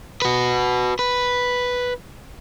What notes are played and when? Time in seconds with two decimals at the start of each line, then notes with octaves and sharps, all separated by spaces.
0.22 F#4 B4
0.99 B4